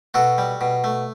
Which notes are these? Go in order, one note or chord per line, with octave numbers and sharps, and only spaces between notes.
B2 F#4 A4
G3
B2
A3